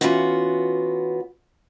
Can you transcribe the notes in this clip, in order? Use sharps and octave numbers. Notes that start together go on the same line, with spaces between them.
E3 G#3 B3 C#4 F4 F#4